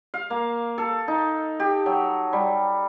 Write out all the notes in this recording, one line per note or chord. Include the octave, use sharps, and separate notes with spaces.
F5
A#3
A4
D#4
G4
F#3
G3